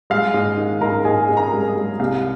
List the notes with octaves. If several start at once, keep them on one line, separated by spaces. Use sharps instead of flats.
G#3 F5
G#2 D#5
D#3
G#2 A#4 A#5
G#2 G#4 G#5
G#2
A#4 A#5
G#3
G#4 G#5
G#3
C2 F5